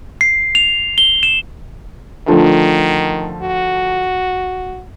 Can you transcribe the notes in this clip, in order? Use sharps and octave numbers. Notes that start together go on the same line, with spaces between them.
C7
F7
G7
E7
D3 D#3 F3 A3
F#4